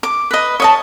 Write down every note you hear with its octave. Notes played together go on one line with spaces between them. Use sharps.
D6
B4 D#5
C#5 D#5 A5